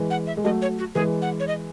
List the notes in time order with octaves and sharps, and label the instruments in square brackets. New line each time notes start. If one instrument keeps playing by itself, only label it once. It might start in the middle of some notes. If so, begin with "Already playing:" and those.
Already playing: [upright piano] E3 G#3
[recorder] F#5
E5
[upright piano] G#3
[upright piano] F#3 A3 [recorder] D#5
[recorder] C#5
F#4
[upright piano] E3 G#3 [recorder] G#4
[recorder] F#5
C#5
D#5